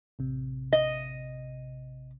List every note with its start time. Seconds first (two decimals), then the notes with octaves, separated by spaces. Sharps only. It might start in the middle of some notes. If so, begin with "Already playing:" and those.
0.19 A1 C3
0.73 D#5